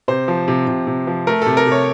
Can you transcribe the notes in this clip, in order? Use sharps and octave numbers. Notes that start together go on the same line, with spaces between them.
C3 C5
F3
C3
C3
C3
F3
A3 A#4
C3 A4
A#4
C3
C#5